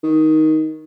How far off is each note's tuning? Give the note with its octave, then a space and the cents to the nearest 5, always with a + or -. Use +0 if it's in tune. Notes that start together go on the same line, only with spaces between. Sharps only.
D#3 +10